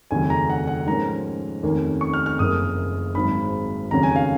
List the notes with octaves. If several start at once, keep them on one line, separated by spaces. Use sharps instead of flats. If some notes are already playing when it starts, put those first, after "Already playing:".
F1 D#2 C#3 F#3 C#4 G#5
A#5
F#5
F#5
G#2 F3 A#3 C#4 A#5
F1 D#2 D#3 A#3 C#4
C#6
F6
F6
F#1 F#2 F3 A#3 D#6
G#1 G#2 F#3 B5
F1 D#2 C#3 F#3 C#4 A#5
G#5
F5